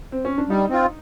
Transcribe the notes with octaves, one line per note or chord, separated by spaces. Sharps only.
C4
C#4
D4
G3 D#4
C4 F4